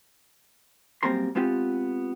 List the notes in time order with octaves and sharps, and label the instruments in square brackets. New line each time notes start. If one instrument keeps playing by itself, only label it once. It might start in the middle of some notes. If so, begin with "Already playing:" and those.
[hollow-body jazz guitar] F#2 G3 A#3 C4 A#4 C6
G#3 B3 C4 F4 G4